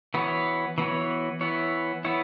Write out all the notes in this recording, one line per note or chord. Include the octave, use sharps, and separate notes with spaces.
E3 B3 F#4 C#5
E3 B3 F#4 C#5
E3 B3 E4 C#5
E3 B3 E4 C#5